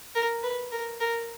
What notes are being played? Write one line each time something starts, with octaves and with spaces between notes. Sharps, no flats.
A#4
B4
A#4
A#4